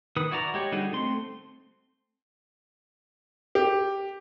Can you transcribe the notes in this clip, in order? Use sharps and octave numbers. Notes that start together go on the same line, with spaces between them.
D#3 B4 D#6
E4 F#4 D5 A#5
G#3 G4 C#5
D3 G3 D#4 F#4
A3 C4 C6
G4